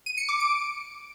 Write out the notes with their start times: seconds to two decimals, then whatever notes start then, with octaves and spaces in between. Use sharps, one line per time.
0.06 D#7
0.17 C#7
0.29 D6
0.40 D7